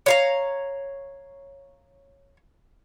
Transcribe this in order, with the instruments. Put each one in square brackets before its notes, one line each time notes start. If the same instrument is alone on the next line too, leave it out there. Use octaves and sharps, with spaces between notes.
[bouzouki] C#5 F5 A#5